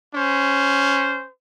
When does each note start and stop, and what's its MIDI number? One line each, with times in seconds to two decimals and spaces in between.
0.14 1.26 61
0.14 1.26 72